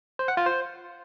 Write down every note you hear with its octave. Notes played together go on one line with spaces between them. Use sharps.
C5
F#5
F4
C5